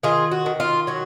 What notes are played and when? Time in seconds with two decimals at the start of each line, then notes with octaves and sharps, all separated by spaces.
0.03 D#3 F4 G#4
0.31 F#4
0.46 D#3
0.60 F4
0.87 F#3 F#4